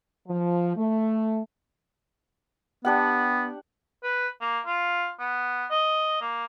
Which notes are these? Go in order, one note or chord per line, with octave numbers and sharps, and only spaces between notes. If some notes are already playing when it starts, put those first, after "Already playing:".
F3
A3
B3 D4 G4 F#5
B4
A#3
F4
B3
D#5
A#3